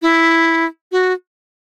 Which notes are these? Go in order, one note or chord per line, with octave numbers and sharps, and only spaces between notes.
E4
F#4